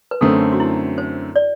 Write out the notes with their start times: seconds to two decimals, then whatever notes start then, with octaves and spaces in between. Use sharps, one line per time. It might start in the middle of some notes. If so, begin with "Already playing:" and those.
0.11 B4
0.21 F#2 D3 A3 C4 A4
0.53 F#4
0.60 E4
0.98 C5
1.36 D5